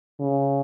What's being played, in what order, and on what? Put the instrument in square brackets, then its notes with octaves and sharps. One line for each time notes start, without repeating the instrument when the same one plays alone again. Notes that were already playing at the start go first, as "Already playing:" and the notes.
[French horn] C#3